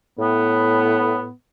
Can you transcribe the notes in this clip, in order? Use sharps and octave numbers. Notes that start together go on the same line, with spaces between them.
A2 B3